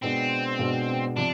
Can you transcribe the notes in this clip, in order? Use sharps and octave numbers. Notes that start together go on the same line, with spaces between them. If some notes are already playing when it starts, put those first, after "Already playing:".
B2 G#3 B3 C4 D4
B2 G#3 B3 D4
C3 F3 D4